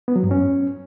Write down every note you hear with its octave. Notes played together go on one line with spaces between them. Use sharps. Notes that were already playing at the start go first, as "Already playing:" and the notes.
B3
F#3
G2
C#4